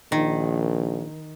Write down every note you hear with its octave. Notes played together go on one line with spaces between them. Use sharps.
A#1 D#3